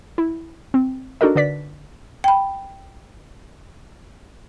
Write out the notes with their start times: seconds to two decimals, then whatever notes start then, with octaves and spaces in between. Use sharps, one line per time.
0.18 E4
0.74 C4
1.21 D4 D#4 F#4 A4 A#4 D#5
1.35 D3 B4 D5 B6
2.24 G5 B5